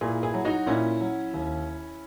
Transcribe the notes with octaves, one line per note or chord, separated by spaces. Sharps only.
A#2 E4 G#4
E4 G#4
F#3
D#4 F#4
A#2 C#4 E4
F#3
D#2